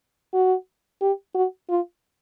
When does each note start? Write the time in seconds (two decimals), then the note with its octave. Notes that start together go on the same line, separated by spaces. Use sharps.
0.34 F#4
1.01 G4
1.34 F#4
1.69 F4